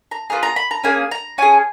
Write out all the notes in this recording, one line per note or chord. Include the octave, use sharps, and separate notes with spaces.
A#5
B3 F4 G#4 A#5
A#5
B5
A#5
A#3 C#4 G#4 G#5
A#5
C#4 G#4 G#5